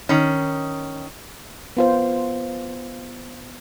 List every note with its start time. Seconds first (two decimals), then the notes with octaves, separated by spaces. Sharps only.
0.09 D#3 C#4
1.77 B3 F4 C5